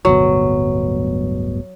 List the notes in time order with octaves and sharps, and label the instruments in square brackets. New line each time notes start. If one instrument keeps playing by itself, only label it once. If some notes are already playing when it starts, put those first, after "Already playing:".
[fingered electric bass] D1 G1 B2 [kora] F#3